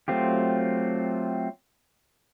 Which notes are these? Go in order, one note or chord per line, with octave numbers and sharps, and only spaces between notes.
F#3 A3 C4 F4 G4